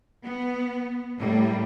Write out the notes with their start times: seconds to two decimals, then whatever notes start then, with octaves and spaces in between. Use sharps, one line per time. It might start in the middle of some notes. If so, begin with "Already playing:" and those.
0.24 B3
1.19 A2 G3 A#3